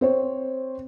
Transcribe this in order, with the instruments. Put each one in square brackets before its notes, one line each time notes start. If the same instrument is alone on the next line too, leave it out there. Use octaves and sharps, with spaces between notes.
[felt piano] C4 C5 C#5